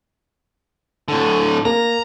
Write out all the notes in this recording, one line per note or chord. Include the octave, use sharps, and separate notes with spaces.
A2 D3
A#3 A#5